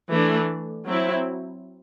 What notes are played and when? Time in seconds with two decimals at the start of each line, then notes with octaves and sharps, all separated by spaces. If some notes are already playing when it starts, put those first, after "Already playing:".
0.10 E3 A3 D4
0.85 F#3 C4 E4